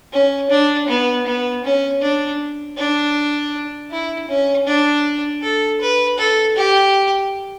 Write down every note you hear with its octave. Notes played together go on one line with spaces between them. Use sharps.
C#4
D4
B3
B3
C#4
D4
D4
E4
C#4
D4
A4
B4
A4
G4